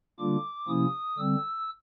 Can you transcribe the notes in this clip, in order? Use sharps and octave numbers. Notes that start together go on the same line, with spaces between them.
D3 G3 A#3 D4 F4 D6
C3 F3 A#3 C#4 E4 D#6
D3 G3 C4 E6